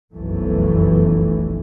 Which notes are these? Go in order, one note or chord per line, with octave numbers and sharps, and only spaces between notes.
F1 B1 F#2 E3 F3 A3